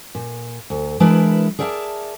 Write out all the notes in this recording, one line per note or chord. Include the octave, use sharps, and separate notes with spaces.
A#2
D2
E3 G#3 D4 E4 A#4 B4
G#4 A#4 D5 E5 G5 A5